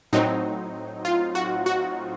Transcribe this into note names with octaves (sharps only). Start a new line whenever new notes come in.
A2 F#3 C4 D#4
F4
F#4
F#4